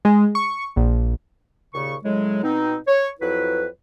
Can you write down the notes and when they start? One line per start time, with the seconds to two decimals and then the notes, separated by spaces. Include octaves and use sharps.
0.05 G#3
0.35 C#6
0.76 A#1
1.74 D#2 A#2 C#3 C#6
2.03 A2 C#3 F#3 G#3
2.43 B2 C4 D#4
2.87 C#5
3.20 F2 F#3 E4 B4